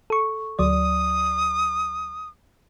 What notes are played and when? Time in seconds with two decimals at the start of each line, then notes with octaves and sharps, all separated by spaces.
0.10 A4 C#6
0.59 D2 F#3 D5 D#6